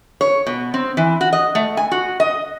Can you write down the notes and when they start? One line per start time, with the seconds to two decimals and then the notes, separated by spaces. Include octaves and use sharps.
0.21 C#5
0.47 B2
0.74 C4
0.97 E3
1.21 F#4
1.33 D#5
1.55 A3
1.77 G#5
1.91 F#4
2.20 D#5